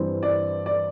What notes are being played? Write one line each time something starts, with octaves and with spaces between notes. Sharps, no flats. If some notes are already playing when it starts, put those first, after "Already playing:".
Already playing: G2 E3 G3 C4
D5
D5